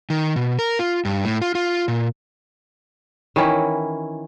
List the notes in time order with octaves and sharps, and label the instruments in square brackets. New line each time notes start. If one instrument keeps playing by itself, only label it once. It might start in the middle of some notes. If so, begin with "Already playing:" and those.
[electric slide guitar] D#3
B2
A#4
F4
G2
A2
F4
F4
A#2
[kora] D#3 E3 C#4 E4